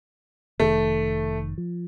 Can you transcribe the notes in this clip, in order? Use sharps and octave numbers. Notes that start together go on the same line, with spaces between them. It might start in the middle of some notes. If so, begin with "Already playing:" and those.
F1 D#3 A3
F3